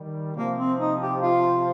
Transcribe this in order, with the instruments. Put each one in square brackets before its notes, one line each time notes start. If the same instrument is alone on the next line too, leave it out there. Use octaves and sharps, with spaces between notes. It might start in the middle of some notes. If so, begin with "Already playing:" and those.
Already playing: [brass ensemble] D#3 G3
[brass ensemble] C3 F3 [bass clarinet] A#3
[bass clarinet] C4
D#4
G4
F4